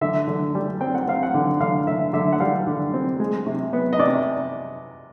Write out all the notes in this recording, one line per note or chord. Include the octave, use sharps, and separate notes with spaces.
D3 E5
D3
G3
C4 G5
F#5
C4 F5
F#5
D3
D3 F5
D3 E5
D3 E5
F#5
G3 F5
D3
C4
G#3
C3
B3
D#5
C3 D5